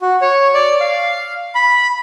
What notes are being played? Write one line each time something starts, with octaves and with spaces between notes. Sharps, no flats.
F#4
C#5
D5
F5
B5